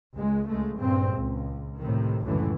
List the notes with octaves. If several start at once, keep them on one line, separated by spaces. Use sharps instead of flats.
C#2 G#3
C#2 G#3 A3
G2 A#2 C#3 C4
C#2
A2 C3 D#3
C#2 F#2 A2 D3 E3